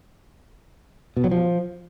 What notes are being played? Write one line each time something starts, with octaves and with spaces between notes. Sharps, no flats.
B2
F#3
F3